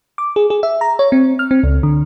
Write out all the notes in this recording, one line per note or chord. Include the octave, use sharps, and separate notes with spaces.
D6
G#4
G#4
E5
A#5
C#5
C4
F6
C4
C#2
D3